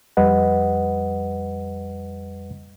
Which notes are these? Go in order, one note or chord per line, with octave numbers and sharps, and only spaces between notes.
F2 G3 B4 D#5 F#5